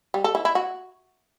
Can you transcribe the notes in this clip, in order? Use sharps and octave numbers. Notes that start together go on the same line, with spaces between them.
G3
A4
E4
E4
F#4